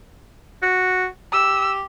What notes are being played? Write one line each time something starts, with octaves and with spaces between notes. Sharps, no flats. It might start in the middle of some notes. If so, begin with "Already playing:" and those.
F#4
G4 E6